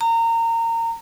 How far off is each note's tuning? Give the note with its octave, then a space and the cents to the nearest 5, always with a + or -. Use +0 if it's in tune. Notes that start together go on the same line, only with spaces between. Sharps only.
A#5 -25